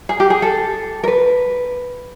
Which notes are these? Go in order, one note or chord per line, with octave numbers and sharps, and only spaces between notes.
G#4
G4
G#4
A4
A#4
B4